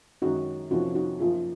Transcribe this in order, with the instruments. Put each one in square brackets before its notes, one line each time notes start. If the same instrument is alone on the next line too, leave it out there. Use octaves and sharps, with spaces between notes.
[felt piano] F#2 D#3 G#3 C#4 [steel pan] D#4 F#4
[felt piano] F2 C3 F3 A#3 C#4 [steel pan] D#4 F#4
[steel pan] D#4 F#4
[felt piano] F#2 F3 A#3 [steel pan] F4 G#4